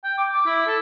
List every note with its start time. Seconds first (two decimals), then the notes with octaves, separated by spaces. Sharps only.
0.04 G5
0.18 D6
0.34 D6
0.46 E4
0.67 A4